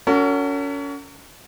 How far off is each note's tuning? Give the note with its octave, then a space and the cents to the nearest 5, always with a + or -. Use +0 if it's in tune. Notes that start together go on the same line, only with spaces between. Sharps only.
C#4 +30 F#4 +0 A#4 -45